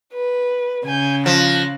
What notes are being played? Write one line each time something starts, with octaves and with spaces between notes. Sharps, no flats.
B4
C#3 G#5 G6
F3 F#6 A#6